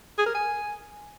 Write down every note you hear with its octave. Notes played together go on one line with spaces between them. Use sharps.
G#4
A#4
G#5